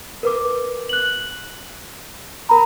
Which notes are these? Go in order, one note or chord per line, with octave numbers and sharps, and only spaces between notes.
A#4 B4 D6
F#6 F#7
A#4 A#5 B5